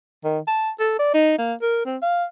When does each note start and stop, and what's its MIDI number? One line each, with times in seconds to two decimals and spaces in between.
0.24 0.39 51
0.47 0.70 81
0.79 0.95 69
0.99 1.13 74
1.14 1.38 63
1.38 1.54 58
1.62 1.83 70
1.85 1.97 60
2.02 2.24 77